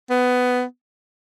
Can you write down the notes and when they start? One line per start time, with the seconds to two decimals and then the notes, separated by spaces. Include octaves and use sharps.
0.10 B3